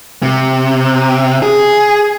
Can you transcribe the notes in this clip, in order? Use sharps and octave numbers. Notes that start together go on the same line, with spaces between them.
C3
G#4